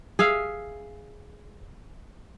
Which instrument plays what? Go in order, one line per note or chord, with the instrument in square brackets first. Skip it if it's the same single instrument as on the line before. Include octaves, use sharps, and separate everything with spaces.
[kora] G#4 E5 F5